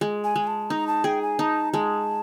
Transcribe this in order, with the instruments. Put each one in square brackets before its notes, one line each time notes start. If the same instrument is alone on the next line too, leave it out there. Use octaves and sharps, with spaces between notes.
[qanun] G#3
[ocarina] G#5
[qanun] G#3
[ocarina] A5
[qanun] D#4 [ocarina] A#5
[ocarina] A5
[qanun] G#4 [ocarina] G5
[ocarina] G#5
[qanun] D#4 [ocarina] A5
[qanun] G#3 [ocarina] A5